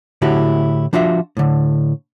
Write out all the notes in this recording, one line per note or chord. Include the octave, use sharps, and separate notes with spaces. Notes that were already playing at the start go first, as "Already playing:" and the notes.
A2 D3 E4 F#4 G4
F3 D4 F4 F#4 E5
A2 D3